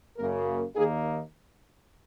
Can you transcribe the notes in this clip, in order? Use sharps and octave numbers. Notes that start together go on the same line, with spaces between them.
F#2 C#3 A#3 A#4
D#2 D#3 A#3 D#4 G#4